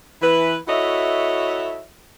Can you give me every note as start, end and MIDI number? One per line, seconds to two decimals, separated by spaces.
0.22 0.56 52
0.22 0.56 64
0.22 0.56 71
0.68 1.81 64
0.68 1.81 66
0.68 1.81 69
0.68 1.81 73
0.68 1.81 75
0.68 1.81 76